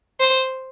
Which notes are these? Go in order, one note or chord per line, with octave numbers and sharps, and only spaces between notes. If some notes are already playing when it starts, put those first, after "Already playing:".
C5